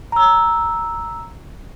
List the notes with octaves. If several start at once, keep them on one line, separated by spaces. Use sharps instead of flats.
A#5 E6